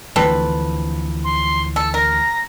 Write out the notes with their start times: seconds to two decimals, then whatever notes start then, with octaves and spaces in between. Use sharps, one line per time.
0.16 D2 E3 F3 C4 A4 B4
1.24 C6
1.76 A4 E6
1.94 A#4 A#6